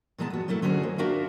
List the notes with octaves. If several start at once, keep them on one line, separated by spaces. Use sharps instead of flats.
A#2 E3 G#3 B3 A5
B3 F#4
F#3 A3 A#3 E4 A4
D3 C#4 F#4 G#4 C5
A#3
D4 F#4 A#4 C5 E5 F5